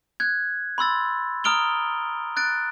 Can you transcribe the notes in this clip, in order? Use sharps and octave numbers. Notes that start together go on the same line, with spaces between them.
F#6 G#6
B5 C6 E6 A6
A#5 D#6 F6 D7 F7 G7
F#6 A6 D7